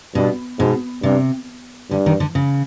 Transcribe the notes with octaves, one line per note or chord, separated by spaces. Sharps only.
G2 B2
G#2 B2
G2 C3
G2 D3
D#3
D3
C#3